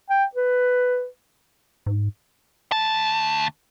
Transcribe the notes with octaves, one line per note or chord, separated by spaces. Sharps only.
G5
B4
G#2
D2 A5